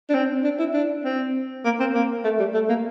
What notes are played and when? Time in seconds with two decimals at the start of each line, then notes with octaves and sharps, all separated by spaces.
0.09 D4
0.14 C4
0.44 D4
0.59 E4
0.74 D4
1.04 C4
1.65 A#3
1.80 C4
1.93 A#3
2.24 A3
2.39 G3
2.54 A3
2.69 A#3